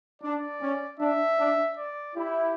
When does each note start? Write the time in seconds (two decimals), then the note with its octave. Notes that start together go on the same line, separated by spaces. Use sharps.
0.22 D4 D5
0.61 C#4
1.00 D4 E5
1.39 D4
1.77 D5
2.16 E4 G4